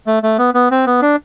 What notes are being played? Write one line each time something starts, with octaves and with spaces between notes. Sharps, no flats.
A3
A3
B3
B3
C4
B3
D4